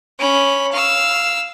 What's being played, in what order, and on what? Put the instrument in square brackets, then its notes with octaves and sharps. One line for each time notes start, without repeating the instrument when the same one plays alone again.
[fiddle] C#4 B5
F5 E6